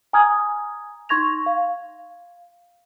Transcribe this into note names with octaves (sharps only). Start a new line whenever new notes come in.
G#5 A#5 D#6 F6 G#6
D#4 C6 C#6 G#6 A#6 F7
F5